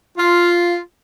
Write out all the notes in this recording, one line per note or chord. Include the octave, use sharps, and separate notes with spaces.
F4